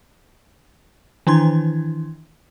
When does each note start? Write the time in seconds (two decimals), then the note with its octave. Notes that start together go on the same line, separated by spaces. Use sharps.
1.27 D#3 E3 D4 E4 C6 G#6